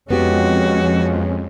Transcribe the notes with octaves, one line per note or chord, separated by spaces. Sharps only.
F2 G#3 B3 C#4 F#4 G4